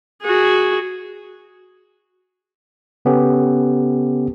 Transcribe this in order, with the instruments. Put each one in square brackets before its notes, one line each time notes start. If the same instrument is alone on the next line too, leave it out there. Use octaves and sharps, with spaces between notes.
[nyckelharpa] F#4 G#4
[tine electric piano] C#3 B3 C#4 G4 A4